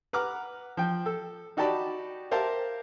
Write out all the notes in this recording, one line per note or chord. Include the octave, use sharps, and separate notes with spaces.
B4 F#5 A#5 D6 F6
F3 G5
A4
D#4 F#4 G4 D5 A5 B5
G4 A#4 C5 E5 F5 A5